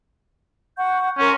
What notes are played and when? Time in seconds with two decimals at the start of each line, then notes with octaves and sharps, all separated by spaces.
0.77 F#5 C#6 G6
1.19 C#4 A#4 G#5 C6